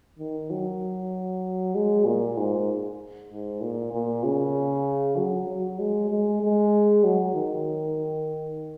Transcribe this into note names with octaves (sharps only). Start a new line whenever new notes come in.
D#3
F#3
G#3
A#2
G#2
G#2
A#2
A#2
C#3
F#3
F#3
G#3
G#3
G#3
F#3
D#3